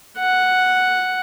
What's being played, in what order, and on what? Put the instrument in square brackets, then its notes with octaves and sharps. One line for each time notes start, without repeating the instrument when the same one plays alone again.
[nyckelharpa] F#5